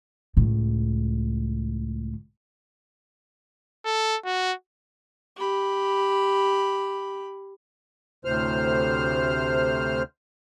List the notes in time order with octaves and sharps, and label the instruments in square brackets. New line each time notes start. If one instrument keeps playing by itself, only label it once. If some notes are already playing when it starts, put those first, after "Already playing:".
[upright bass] C#2 A2
[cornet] A4
F#4
[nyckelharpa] G4 B5
[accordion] D2 A2 C3 C5 F6